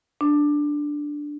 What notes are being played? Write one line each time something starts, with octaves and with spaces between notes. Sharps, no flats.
D4